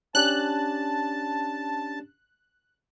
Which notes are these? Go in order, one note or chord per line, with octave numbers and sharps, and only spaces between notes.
C#4 D4 G4 A5 F#6